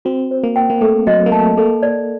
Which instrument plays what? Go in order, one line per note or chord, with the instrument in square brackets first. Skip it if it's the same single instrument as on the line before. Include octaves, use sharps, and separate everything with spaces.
[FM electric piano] C4 [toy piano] F#4
[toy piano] C5
[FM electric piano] A#3
[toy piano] G5
[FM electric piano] A#3
[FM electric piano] A3 [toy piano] A4
[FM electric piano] F#3 [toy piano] D#5
[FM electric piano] A#3
[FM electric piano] A3 [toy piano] A5
[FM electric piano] A#3 [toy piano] A4
[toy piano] D5